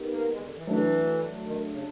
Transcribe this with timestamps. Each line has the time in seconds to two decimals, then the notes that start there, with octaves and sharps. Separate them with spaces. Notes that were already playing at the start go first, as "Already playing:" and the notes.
Already playing: B3 D#4 G4 A#4
0.10 A#3
0.30 G#3
0.35 D#3
0.42 D3
0.54 E3
0.67 E3 F#3 A3 D4
1.44 D#3
1.70 C#3